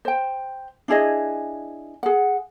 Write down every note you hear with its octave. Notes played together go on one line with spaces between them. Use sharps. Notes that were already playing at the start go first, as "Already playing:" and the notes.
C5 G5
D4 E4 G#4 D#5
G#4 F#5